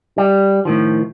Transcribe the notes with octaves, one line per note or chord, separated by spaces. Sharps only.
G3
A2 D#3 F3